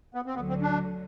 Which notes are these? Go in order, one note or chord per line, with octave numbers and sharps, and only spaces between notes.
B3
C4
D2 D3 F#3 B3
C4
D4